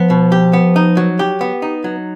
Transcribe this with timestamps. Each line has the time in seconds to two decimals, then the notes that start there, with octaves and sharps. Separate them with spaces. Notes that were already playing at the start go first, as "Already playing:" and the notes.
Already playing: F3 B3
0.10 B2
0.32 G4
0.53 B3
0.76 D#4
0.97 F#3
1.19 G4
1.41 B3
1.62 D#4
1.84 F#3